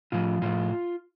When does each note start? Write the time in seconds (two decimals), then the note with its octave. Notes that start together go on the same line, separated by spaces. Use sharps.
0.12 A2 F3 F4
0.42 A2 F3 F4